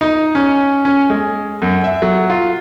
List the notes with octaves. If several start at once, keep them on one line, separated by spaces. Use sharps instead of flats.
D#4
C#4
C#4
G#3
F#2
E5
F#3
F4